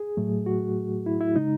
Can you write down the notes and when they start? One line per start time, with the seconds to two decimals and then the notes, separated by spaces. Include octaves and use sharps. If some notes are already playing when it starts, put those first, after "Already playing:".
Already playing: G#4
0.17 A2 F#3 A3
0.46 F#4
1.06 E4
1.20 E4
1.36 C#3 G#3 D#4